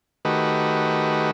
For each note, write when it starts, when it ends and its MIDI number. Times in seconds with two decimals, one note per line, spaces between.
0.25 1.31 51
0.25 1.31 57
0.25 1.31 66
0.25 1.31 67
0.25 1.31 71
0.25 1.31 75